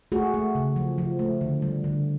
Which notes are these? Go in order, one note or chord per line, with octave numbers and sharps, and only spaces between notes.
A3 F#4 G#4
A3
C#3
F3
F3
A3
D3
G3
D3